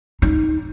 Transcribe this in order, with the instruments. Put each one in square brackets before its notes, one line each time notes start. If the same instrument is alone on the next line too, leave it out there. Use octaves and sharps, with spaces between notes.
[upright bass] D#4